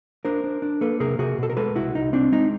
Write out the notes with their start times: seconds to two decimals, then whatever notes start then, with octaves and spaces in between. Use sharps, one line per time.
0.25 D4 A#4 C5
0.44 D4
0.62 D4
0.81 A#3 A4 B4
1.00 C3 G#4 A#4
1.19 C3 F#4 G#4
1.38 B2 A4
1.50 A#4
1.57 G#3 A4 B4
1.76 C2 E4 F#4
1.95 C2 D#4
2.13 C4 D4
2.32 G#3 D#4